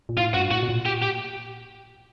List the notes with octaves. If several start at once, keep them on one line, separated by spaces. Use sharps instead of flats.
A#2
A2 F4
G2 F#4
A2 F#4
B2
A#2
G4
G4